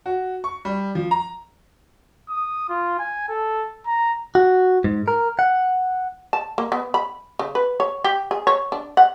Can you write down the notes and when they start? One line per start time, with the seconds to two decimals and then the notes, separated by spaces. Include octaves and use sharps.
0.06 F#4
0.44 C#6
0.65 G3
0.95 F3
1.11 A#5
2.29 D#6
2.69 F4
2.99 G#5
3.28 A4
3.87 A#5
4.35 F#4
4.84 G#2
5.08 A#4
5.39 F#5
6.33 A5
6.58 A#3
6.72 B3
6.94 B5
7.39 C#3
7.55 B4
7.80 C#5
8.04 G4
8.31 G#4
8.47 C#5
8.72 D4
8.97 F#5